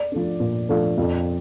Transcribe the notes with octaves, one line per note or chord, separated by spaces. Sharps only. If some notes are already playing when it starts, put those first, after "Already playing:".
Already playing: D5
F3 A3 D4
A#2
F3 A3 D4
F2